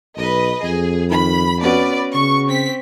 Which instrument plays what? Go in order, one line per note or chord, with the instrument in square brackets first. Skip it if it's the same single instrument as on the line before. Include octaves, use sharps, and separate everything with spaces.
[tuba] B1 [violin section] B4 D#5
[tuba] F2 [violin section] G#4
[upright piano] D#3 [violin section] B5
[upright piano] B3 C#4 F#4 [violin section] B4 D5
[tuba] C#3 [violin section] C#6
[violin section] C4 B6